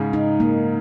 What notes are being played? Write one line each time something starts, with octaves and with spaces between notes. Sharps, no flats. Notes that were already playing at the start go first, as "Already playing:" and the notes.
Already playing: G#2 C#3
D#4
A#3